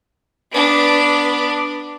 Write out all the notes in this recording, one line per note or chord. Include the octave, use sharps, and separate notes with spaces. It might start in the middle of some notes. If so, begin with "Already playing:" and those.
B3 D4